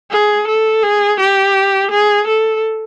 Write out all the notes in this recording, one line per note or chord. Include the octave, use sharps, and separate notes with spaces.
G#4
A4
G#4
G4
G#4
A4